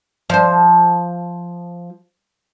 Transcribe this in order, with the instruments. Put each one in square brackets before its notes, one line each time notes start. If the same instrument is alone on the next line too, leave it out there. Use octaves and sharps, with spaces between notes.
[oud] F3 C5